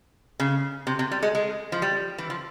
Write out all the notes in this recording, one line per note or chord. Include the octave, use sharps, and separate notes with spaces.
C#3
C3
C3
G3
G#3
G#3
F3
G3
E3
F3